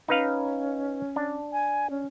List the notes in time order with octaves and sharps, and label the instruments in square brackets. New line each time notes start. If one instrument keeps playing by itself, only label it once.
[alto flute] C#4 [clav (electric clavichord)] D#4 B4 F5
[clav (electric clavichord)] D4
[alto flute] G#5
C#4